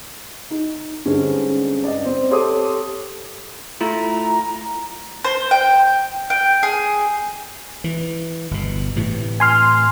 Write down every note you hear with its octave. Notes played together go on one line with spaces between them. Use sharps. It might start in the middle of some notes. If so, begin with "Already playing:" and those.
D#4
G2 D3 G#3 C4 C#4 D#4
D5 D#5
C4
G4 A4 C#5 C6 D6 D#6
A3 E4 F4 A#5
C5
G5
G5
G#4
E3
G1 B2
A2 C3 E3
G#5 C6 F6